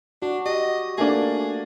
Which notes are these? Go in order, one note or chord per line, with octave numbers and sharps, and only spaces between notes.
D4 F#4
G4 D#5
A3 A#3 D4 G#4